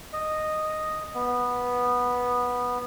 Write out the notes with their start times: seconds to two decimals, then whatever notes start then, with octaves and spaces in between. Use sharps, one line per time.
0.13 D#5
1.14 B3